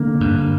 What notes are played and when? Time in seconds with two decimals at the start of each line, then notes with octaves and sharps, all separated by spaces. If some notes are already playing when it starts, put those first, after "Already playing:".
Already playing: D3 A#3
0.21 G2